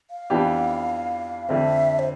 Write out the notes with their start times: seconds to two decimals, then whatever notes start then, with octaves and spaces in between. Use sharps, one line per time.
0.11 F5
0.30 F2 E3 B3 D4 G4
1.49 F2 D3 A3 C4 E5
1.99 C5